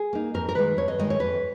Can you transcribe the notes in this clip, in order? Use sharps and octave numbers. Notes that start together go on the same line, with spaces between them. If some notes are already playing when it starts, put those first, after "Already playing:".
Already playing: G#4
A#3 D#4
F2 A#4
A#4
D#3 G#3 B4
F2 C#5
D#5
D#3 G#3 D#5
C#5
F2 B4